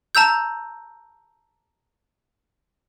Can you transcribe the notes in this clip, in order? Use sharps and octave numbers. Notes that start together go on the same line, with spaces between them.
A5 A#5 E6 G6